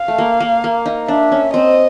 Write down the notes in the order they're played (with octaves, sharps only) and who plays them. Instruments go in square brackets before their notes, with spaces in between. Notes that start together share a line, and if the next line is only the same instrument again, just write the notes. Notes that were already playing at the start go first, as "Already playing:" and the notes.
Already playing: [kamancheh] F5
[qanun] A3
A#3
A#3
A#3
D#4
[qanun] D4 [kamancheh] E5
[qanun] C#4
[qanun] C4 [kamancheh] D#5